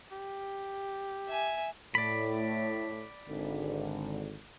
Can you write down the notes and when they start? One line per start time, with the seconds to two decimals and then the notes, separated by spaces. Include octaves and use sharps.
0.11 G4
1.27 E5 G#5
1.95 A2 D5 B5
3.28 G#1 D3